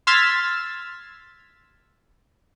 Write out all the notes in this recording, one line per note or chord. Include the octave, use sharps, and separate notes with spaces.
C6 E6 F6 G#6 A6 B6